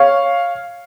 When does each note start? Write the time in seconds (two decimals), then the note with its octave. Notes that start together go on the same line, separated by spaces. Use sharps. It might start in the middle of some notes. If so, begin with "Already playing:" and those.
Already playing: C#5 F5